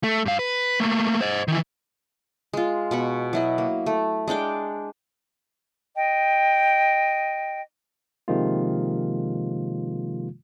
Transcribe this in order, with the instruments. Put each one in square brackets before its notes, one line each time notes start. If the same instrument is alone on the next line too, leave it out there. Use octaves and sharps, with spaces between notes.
[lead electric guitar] A3
G2 F5
B4
A3 A#3
C5 D#5
D#3 E3
[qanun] G#3 F4
B2 B5 C#6
F#3 E4 D#5
A#3
A3
G#3 D4 G5 D6
[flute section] D#5 G5
[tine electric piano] C3 D#3 F3 G#3 A#3 F4